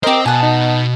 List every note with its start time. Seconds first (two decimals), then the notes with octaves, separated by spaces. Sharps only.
0.03 C4 G4 A#4 C5 D#5
0.26 B2 F#5 G#5 A5
0.42 D#4